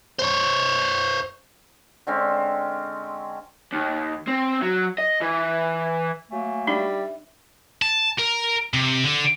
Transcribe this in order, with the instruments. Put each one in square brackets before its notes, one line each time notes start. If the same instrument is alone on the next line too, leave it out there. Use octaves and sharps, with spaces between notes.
[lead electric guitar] C5 C#5
[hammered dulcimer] D3 G#3 C4 C#4
[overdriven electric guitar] D#2
C4
F#3
D#5
E3
[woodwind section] F#3 A3 A#3 [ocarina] G#5
[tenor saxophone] G3 [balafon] D4 D#4 [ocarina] E5
[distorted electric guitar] A5
A#4
C3
D3